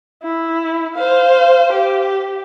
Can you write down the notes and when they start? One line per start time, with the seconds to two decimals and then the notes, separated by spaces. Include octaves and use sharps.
0.23 E4
0.95 C5 F5
1.72 G4